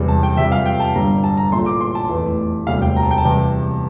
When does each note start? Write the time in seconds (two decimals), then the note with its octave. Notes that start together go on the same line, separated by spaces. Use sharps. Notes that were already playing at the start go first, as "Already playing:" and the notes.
Already playing: E1 E2 C3 G3
0.08 A5
0.23 G5
0.37 F2 C3 G3 E5
0.52 F5
0.66 G5
0.80 A5
0.95 G1 G2 D3 G3 A#5
1.24 A5
1.37 A#5
1.52 A#1 A2 F3 A3 C6
1.66 D6
1.80 C6
1.95 A5
2.09 F1 E2 E3 A3
2.67 E1 D2 C3 G3 F5
2.82 G5
2.96 A#5
3.03 A5
3.11 G5
3.18 A5
3.24 E2 C3 G3